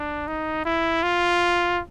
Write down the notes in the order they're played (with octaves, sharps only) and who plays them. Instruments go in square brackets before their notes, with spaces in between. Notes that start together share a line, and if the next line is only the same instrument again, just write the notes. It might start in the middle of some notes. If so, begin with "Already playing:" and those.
Already playing: [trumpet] D4
D#4
E4
F4